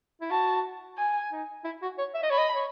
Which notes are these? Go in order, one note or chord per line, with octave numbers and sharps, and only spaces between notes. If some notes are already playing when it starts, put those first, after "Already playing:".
E4
F#4 A5
G#5
D#4
E4
F#4
C#5
E5
D#5
C#5 B5
D#5
C#5